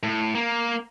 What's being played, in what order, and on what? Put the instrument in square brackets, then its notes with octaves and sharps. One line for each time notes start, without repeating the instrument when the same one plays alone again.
[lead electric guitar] A2
A#3